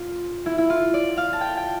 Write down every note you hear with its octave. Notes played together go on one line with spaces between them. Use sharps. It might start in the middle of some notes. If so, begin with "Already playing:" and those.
Already playing: F4
E4
E4
F4
D5
F5
A5
G5
G5